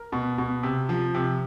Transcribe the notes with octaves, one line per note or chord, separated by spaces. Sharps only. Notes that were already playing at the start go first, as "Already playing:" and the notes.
Already playing: A#4
B2
B2
C3
F3
C3